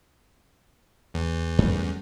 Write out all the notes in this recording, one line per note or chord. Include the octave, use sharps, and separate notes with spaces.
E2
F#2 G3 A3